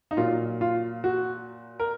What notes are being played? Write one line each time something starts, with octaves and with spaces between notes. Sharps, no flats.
D#4
A#2 F#3 F4
F4
F#4
A#4